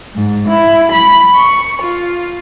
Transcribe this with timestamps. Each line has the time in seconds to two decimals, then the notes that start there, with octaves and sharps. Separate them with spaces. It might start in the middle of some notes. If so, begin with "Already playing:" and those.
0.15 G#2
0.49 E4
0.92 B5
1.35 C#6
1.83 F4